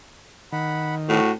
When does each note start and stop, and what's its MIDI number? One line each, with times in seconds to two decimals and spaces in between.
0.52 1.21 51
0.52 0.95 78
0.52 0.95 83
1.09 1.32 45
1.09 1.32 66